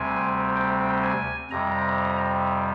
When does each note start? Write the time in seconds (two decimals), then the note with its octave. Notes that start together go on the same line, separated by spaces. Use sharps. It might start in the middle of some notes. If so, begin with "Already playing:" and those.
Already playing: D2 C3 G3 C4 G#5
0.56 G5
1.03 G#5
1.51 F2 C3 G3 A#5